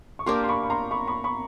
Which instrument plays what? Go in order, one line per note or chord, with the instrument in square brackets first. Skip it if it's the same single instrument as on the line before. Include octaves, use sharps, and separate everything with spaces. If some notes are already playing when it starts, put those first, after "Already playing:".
[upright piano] C#6
[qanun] A#3 D4 G4 A#4 [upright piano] C6 D6
[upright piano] C6
B5 C#6
B5
A#5 C6
B5 C#6
B5 C#6
B5 C#6